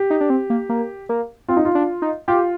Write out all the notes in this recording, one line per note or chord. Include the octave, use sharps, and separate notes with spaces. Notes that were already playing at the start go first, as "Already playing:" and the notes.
Already playing: G4
D#4
D4
C4
A#3
A#3
A#3
C4 F4
D#4
F4
D4
D#4
F4 G4